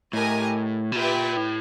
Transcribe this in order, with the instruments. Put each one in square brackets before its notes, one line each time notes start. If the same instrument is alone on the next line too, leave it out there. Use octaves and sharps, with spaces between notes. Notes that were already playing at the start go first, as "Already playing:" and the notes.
[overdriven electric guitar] A2 [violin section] G4 A#4 D#5 G#5
[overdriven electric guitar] B2
[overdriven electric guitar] A#2 [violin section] G4 B4 E5 G5
[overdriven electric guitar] A2